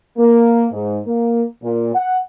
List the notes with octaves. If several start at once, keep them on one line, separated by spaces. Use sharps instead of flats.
A#3
G#2
A#3
A#2
F#5